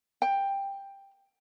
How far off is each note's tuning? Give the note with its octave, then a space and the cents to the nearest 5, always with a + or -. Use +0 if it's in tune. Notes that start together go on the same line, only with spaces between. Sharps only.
G5 +10